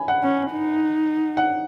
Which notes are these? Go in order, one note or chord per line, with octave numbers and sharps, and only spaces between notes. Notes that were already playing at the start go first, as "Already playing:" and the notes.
Already playing: G#5 B5
F#5
C#4
D#4
F#5